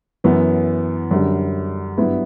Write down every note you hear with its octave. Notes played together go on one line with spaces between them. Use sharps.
F#2 E3 B3
F#2 D3 G3
G2 F#3 B3 E4